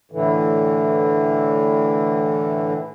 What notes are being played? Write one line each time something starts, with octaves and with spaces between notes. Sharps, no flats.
A2 D3 E3